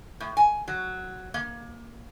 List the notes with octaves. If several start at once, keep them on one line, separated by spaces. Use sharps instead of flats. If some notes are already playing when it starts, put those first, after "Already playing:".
A2
G#5
F#3
A#3